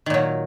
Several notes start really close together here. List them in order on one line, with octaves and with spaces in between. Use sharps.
D#3 A#2 F#3